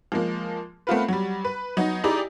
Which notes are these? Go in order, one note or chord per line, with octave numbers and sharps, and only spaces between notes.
F3 G#3 A#3
A3 B3 C4 F4 A#4 B4
F#3 G3
B4
F#3 B3 D#4
D#4 E4 G4 G#4 D5 A#5